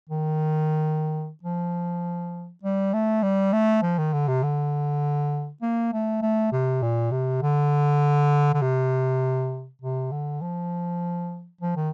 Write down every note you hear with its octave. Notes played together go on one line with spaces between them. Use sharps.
D#3
F3
G3
A3
G3
A3
F3
D#3
D3
C3
D3
A#3
A3
A3
C3
A#2
C3
D3
D3
C3
C3
D3
F3
F3
D#3